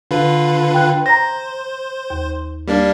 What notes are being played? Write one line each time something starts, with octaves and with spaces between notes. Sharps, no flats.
D3 F4 B4
G5 F#6
C5 A#5 A#6
D#2
G3 A#3 D4